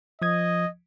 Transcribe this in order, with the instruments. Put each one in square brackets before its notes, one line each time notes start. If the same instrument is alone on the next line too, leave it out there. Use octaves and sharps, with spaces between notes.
[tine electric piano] F3 D#6 G#6 [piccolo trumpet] D#5